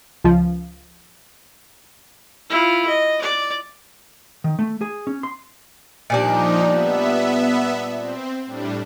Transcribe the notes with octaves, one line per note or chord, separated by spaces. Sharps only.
C#2 F3
E4 F4
D#5
D5
D#3
A3
G#4
C#4
C6
A#2 F3 G3 D4 D#4
B3 E5
C4
A2 G3 D4